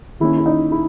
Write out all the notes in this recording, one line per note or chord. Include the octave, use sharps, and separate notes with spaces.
D#3 A#3 C#4 E4
E4
D#4
E4